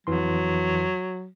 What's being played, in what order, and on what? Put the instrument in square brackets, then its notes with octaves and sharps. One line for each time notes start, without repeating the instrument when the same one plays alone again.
[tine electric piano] F2 E3 C6 [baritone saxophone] F#3